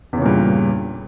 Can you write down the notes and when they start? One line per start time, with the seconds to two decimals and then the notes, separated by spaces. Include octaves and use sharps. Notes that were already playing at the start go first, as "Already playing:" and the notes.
0.13 E2
0.17 C#3
0.21 A#2
0.26 G2